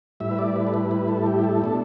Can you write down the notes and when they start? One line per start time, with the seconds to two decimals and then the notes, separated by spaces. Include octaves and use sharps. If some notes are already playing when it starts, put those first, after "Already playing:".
0.20 A2 G3 E4 E5
0.31 B4
0.39 D5
0.56 B4
0.67 A4
0.74 B4
0.91 B4
1.08 A4
1.26 G4
1.44 A4
1.62 B2 A3 D4